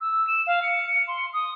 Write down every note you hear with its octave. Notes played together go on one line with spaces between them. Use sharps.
E6
E7
F5
C#7
C6
D#6